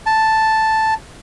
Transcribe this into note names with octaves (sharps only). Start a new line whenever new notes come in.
A5